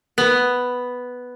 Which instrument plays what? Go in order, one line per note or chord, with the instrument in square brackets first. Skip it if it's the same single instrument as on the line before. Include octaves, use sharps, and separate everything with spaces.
[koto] B3